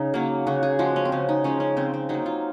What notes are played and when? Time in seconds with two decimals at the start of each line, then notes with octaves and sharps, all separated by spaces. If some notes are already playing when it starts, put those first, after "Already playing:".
Already playing: C#3 D#4
0.14 F#3 A#3
0.47 C#3 F#4
0.63 G#4
0.79 F3 G#3 F#4
0.96 C#4
1.05 C4
1.12 C#3 C#4
1.29 D#4
1.44 F3 G#3 C#4
1.60 C#4
1.77 C#3 C4
1.94 C4
2.09 F#3 A#3 D#4
2.26 F4